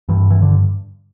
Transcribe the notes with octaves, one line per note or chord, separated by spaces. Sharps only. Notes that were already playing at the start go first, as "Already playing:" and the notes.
G2 E3
E3
D3